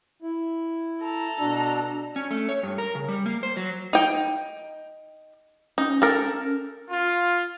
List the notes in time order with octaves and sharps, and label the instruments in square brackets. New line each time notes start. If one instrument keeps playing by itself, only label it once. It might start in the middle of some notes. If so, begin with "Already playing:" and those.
[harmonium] E4
[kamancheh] A4 A#5
[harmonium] B2 F#4 [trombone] D4
[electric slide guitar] C#4
A3
C#5
G2
A#4
C#3
G3
A#3
C5
F#3
[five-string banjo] D#4 G5
[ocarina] C#4 [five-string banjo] D#4
[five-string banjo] A4 A#4
[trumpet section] F4